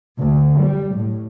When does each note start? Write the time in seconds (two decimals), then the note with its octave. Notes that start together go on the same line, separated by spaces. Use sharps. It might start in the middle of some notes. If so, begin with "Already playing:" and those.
0.17 D2
0.59 G3
0.95 A2